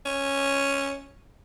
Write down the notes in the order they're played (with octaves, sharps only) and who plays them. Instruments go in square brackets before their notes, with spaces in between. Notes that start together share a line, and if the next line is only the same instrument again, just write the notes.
[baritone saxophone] C#4